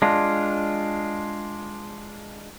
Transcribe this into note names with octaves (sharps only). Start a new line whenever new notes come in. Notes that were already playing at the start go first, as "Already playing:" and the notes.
G#3 D4 F4